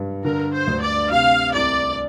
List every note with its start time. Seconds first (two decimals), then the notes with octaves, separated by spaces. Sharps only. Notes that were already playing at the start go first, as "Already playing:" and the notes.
Already playing: G2 G3
0.25 D3 A#4
0.54 C5
0.67 D2
0.82 D5
1.11 C3 F5
1.54 C2 D5